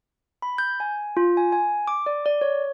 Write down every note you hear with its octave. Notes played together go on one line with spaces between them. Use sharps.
B5
G6
G#5
F4
G#5
G#5
D6
D5
D5
C#5